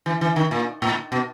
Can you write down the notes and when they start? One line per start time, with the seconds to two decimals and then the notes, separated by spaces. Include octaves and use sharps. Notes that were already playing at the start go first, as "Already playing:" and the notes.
0.06 E3
0.21 E3
0.36 D#3
0.51 A#2
0.82 A2
1.12 B2